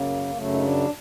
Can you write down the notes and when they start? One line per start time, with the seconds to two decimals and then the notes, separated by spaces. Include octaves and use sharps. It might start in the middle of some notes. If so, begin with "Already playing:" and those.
Already playing: F#2 C#3 F#3 A#3
0.35 F#2 C#3 F#3 A3
0.53 D#4
0.62 D4